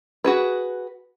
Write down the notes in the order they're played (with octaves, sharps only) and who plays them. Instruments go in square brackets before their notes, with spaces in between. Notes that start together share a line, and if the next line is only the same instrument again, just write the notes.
[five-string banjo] F#4 G#4 B4